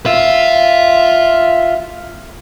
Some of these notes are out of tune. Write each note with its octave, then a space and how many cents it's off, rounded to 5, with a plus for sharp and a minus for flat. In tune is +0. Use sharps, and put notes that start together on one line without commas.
F4 +0 E5 +0